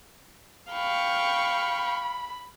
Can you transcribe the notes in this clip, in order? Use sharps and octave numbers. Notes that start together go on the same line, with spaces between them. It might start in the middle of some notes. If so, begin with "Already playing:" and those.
F5 G5 B5 C#6